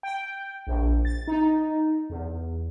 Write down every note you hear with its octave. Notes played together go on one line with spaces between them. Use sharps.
G5
A#1
A6
D#4
E2